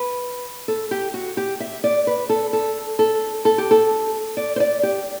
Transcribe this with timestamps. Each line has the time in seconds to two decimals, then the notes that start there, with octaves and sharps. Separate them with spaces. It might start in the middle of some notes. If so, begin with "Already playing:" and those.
Already playing: B4
0.68 A4
0.91 G4
1.14 F#4
1.37 G4
1.60 E5
1.84 D5
2.07 B4
2.29 A4
2.53 A4
2.99 A4
3.45 A4
3.58 G4
3.71 A4
4.37 D5
4.56 C5
4.60 D5
4.83 G4